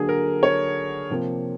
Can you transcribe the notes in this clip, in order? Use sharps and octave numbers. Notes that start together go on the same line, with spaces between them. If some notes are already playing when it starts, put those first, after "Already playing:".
Already playing: D3 F#3 A#3 G#4
A#4
C#5
C3 F3 A#3